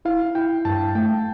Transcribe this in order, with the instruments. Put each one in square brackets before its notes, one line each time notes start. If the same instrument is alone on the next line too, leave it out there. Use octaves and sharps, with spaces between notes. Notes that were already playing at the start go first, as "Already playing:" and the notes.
[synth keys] E4 [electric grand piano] F5
[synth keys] E4 [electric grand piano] G5
[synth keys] G2 [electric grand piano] A5
[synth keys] A3 [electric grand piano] G5